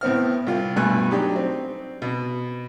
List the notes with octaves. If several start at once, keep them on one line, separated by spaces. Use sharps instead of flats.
A2 B3 C4 F6
C2 F4
B1 G2 B2 A3 G#5 F#6
F#3 D4 D#4 G4
C4
B2